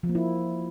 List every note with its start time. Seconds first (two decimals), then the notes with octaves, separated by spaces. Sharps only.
0.03 F3
0.09 A#3
0.15 E4